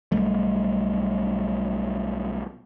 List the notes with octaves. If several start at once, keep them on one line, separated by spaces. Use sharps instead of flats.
B1 G3 A3